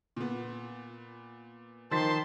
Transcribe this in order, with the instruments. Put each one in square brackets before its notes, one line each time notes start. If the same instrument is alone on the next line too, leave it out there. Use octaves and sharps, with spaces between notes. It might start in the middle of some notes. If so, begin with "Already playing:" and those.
[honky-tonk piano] A#2 B3
[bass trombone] D#3 [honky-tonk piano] F3 A6 B6 [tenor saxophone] C5 [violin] A5 C6